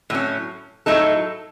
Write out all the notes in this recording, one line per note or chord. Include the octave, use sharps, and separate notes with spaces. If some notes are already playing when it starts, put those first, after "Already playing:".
A2 F#3 C#4
A2 F#3 A3 D#4 A4